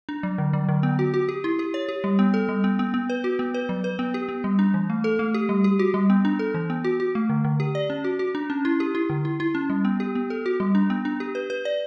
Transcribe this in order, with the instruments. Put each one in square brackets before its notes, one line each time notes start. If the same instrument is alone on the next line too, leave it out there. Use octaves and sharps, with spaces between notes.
[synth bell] D4
F#3
D3
F#3
D3
B3
F#4
F#4
G4
E4
G4
C#5
G4
G3
B3
A4
G3
B3
B3
B3
B4
F#4
B3
B4
F#3
B4
B3
G4
B3
G3
D4
E3
A3
A4
A3
G4
G3
G4
F#4
G3
B3
D4
A4
E3
B3
F#4
F#4
A3
D3
D3
G4
D5
C#4
F#4
F#4
D4
C#4
E4
G4
E4
D3
E4
E4
C#4
G3
B3
G4
B3
A4
F#4
G3
D4
B3
D4
G4
B4
B4
D5